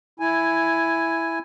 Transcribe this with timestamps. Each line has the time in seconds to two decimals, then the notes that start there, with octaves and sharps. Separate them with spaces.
0.20 E4 G#5